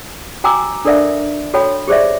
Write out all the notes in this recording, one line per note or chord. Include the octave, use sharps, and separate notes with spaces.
F#4 G5 G#5 A#5 D6 E6
D4 A4 A#4 D5 E5 F5
F#4 A4 C#5 G5 B5
G4 G#4 C5 D5 E5